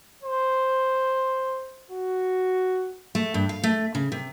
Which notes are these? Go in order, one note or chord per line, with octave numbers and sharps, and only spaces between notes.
C5
F#4
A3
G2
F5
A3
C#3
C3